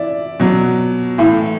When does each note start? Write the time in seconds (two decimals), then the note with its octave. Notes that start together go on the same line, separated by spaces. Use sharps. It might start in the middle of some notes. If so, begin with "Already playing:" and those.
Already playing: E3 D5 E5
0.40 B2 F#3
1.18 A2 E3